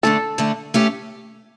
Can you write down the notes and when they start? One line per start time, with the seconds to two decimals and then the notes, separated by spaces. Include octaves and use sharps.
0.03 D3 A3 D4 A4
0.38 D3 A3 D4
0.74 A3 C#4 G4